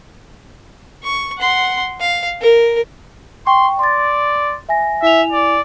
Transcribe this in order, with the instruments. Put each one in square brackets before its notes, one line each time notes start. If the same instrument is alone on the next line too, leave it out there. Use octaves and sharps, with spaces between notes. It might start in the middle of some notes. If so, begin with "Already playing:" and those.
[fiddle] C#6
F#5 C6
F5
A#4
[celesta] G5 C#6 [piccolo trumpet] C6
[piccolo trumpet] D5 [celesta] C6 A6
[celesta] E5 G#5 A#6
[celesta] E4 G#5 F7 [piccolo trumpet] E5
[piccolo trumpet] D5